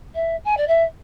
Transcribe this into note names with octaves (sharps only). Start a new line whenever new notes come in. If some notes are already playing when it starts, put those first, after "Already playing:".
E5
G#5
D5
E5